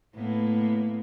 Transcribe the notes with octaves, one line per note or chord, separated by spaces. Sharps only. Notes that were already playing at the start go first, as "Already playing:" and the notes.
A2 A#3 B3